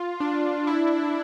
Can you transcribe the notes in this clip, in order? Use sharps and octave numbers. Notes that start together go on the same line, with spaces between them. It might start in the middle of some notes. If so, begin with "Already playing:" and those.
Already playing: F4
D4
E4